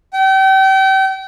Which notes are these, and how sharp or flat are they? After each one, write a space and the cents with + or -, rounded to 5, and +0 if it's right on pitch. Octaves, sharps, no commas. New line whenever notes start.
G5 -35